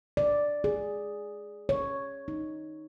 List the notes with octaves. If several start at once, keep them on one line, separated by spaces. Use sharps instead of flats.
D5
G#4
C#5
D#4